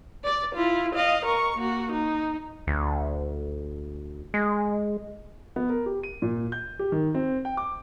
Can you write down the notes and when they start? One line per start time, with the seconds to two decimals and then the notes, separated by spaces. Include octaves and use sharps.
0.24 D5
0.55 E4 F4
0.95 D#5 F5
1.25 A#4 C#6
1.57 A#3 F#4
1.91 D#4
2.67 D2
4.34 G#3
5.56 B3
5.69 A#4
5.86 G4
6.03 D#7
6.22 A#2
6.52 G6
6.79 G4
6.92 D#3
7.15 C4
7.45 G5
7.57 D6